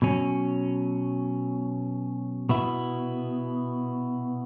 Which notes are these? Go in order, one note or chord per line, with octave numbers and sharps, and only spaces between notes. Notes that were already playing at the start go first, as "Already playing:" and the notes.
B2 F#3 C#4
B2 B3 E4